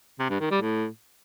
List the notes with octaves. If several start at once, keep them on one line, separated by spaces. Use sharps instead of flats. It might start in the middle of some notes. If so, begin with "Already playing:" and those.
C3
G2
D#3
G3
A2